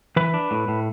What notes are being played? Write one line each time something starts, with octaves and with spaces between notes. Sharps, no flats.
E3 B4
D4
A2
A2